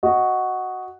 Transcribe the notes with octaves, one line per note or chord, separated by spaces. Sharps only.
F#4 D#5